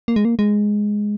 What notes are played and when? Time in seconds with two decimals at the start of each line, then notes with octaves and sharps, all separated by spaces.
0.08 A#3
0.16 G#3
0.25 A#3
0.39 G#3